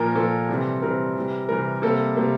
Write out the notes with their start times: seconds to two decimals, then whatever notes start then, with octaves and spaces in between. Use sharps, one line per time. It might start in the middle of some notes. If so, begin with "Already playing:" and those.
Already playing: A#2 F3 A#3 A#4
0.15 A#2 F3 A#3 A4
0.49 C3 E3 G3 C4
0.82 C3 E3 G3 C4 A#4
1.16 C3 E3 G3
1.49 C3 E3 G3 A#4
1.82 C3 G3 A#3 A4
2.16 C3 G3 A#3